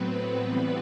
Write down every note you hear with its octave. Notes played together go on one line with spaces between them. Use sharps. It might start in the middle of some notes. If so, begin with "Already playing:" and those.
Already playing: A2 F#3 B3 C4 B4
E3 G3 C4